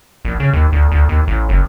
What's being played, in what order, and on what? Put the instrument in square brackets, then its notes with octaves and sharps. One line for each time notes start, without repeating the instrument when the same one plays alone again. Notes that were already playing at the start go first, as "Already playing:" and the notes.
[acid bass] A#1
C#3
D#2
D2
D2
D#2
A1
F#1